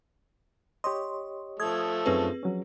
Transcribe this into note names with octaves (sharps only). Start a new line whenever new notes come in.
G4 C#5 D#5 C6
F3 A3 D#6 G#6
F#2 C4 C#4 D#4 G#4 B4
F3 F#3 C#4